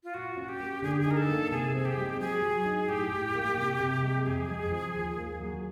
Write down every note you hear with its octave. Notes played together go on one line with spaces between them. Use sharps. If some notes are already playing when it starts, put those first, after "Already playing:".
F4
A#2 F#4
C#4
G4
A#3
D3 G#4
G4
G#4
D#4 A#4
A4
A#3
C3 G#4
C4
G4
G#3
F#3 G#4
F#3
D#4
A2 G4
A2
A#3
C3
C3
G#3
F2 G#4
G#3
F3
D#2
A#3
F#3